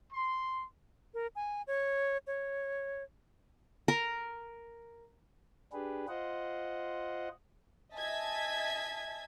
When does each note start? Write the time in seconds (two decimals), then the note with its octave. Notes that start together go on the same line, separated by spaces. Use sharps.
0.13 C6
1.14 A#4
1.36 G#5
1.67 C#5
2.27 C#5
3.88 A#4
5.73 D4 G4 G#4 B4
6.08 F4 C5 D#5 F#5
7.94 D#5 E5 G#5 A5 G#6 B6